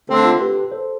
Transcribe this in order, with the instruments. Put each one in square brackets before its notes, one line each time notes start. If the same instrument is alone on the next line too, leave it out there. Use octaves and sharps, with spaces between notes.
[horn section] D3 A3 C4 [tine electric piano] A4 C5
[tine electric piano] F4 A4
G4 B4
A4 C5